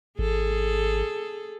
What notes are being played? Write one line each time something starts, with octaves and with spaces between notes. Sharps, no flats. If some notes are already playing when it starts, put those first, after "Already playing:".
G#1 G#4 A4